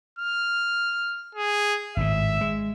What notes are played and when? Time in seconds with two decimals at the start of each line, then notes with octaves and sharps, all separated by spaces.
0.19 F6
1.35 G#4
1.97 G#1 A2 E5
2.41 G#3